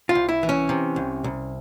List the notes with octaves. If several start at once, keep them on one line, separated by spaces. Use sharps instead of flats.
F4
C2
E4
E3
C#4
C3
C2
C2